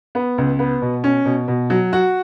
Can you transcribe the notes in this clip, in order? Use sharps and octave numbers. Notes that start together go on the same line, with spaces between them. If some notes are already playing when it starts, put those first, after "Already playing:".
B3
C#2
B3
B2
C#4
B2
B2
F#3
F#4